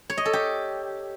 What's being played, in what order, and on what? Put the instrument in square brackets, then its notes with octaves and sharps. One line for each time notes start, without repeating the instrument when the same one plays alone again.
[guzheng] C#5
D#5
A4
G4